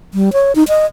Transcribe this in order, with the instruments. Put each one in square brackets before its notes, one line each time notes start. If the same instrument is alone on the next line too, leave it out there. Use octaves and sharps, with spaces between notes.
[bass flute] G3
C#5
D#4
D#5